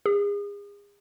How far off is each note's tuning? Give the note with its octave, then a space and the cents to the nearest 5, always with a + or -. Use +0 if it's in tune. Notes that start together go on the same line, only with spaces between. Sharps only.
G#4 -35